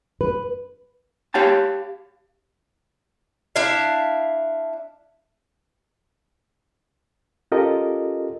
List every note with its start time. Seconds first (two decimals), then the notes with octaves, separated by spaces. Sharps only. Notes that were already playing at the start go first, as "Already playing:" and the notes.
0.21 B4
1.34 G4 C#5 F5 G5 A5
3.56 D4 E4 E5 F5
7.52 C#4 F4 G4 A4 A#4 D#5